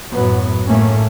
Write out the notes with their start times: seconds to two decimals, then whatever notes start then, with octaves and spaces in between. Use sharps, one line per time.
0.13 F#2 A2 F#3 B3
0.66 G#1 A2 A3 A#3 C#4